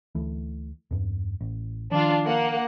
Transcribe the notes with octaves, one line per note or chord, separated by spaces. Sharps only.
D2 E3 A3
E2 G2
A1
D#3 F3 D4 F4
A#3 F#5